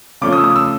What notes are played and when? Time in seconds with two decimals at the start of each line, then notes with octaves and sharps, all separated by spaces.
0.21 C#3 F3 A3 C#4 D6
0.33 D#6
0.38 E6
0.44 D#6
0.56 E6